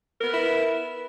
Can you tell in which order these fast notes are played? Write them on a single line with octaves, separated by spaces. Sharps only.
A#4 B3 B4 E4